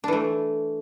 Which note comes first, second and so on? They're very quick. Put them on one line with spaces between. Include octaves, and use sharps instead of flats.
D4 E3 A3